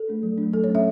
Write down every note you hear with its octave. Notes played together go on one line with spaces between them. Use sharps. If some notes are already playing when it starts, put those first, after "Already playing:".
Already playing: A4
A3 D4
F#3
A3 D4
F#3 A4
C#5
A3 C#4
E5